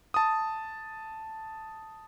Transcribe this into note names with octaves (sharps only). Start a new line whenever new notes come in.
A5 D#6